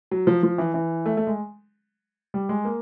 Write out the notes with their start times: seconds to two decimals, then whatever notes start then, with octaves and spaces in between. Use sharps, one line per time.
0.11 F#3
0.27 F3
0.43 F3
0.58 E3
0.74 E3
1.06 A3
1.17 A3
1.27 G#3
2.34 G3
2.49 G#3
2.65 A#3